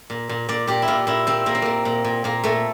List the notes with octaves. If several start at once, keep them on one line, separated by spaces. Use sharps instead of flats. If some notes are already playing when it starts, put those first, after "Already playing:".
A#2
A#2
A#2 D5
A#2 G4
E4
A#2 F4
A#2 E4
A#2 C4
A#2 A#3
C4
A#2 A#3
A#2
A#2
A#2 A#3
A#2 A3